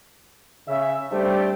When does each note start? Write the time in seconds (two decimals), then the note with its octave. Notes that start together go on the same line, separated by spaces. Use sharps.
0.68 C#3 E5
1.11 G3 A3 C4 D4 G4 C5